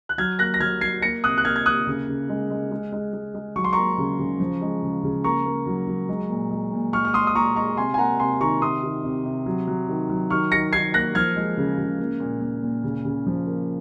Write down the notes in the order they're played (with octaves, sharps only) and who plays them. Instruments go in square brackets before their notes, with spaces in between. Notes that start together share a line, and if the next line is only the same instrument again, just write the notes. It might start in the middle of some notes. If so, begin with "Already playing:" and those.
[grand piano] F#6
F#3 F6 G#6
A#3 F#6 A#6
A#6
F#3 F6 G#6
F#3 G#6 C7
A#3 A#6 C#7
C3 D#6 F#6
F#6
A#3 F6 G#6
G#6
A#3 D#6 F#6
C#3
C#3
G#3
G#3
G#3
G#3
G#3
G#3
F#3 C#6
C6
A#3 A#5 C#6
C#3
C#3
F3
G#3
C#3
C#3
A#3 A#5 C#6
A#3
F#3
F#3
G#3
A#2
G#3
A#2
G#3 C#6 F6
F6
G#3 C6 D#6
D#6
A#2 A#5 C#6
G#3 A#5 C#6
C3 G#5 C6
G#5
A#3 F#5 A#5
C3 G#5 C6
D#3 A#5 C#6
C3 C6 D#6
D#3
C3
C3
F#3
F#3
D#3
F#3
D#3 C#6 F6
D#3 A#6 C#7
D#3 G#6 C7
A#3 F#6 A#6
F3 F6 G#6
G#3
C#3
C#3
A#3
A#2
A#2
A#2
C#3
C#3
F3
A#3